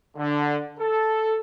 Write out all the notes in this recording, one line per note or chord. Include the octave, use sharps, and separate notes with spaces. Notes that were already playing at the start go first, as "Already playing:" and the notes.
D3
A4